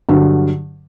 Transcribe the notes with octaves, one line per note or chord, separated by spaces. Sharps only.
G2 D3 F#3